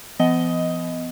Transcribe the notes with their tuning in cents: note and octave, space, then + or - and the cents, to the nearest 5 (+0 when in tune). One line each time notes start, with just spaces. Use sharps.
F3 -40 B3 +25 D#5 +10